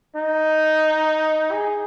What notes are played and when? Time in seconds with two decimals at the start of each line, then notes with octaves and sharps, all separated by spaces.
0.16 D#4
1.52 G#4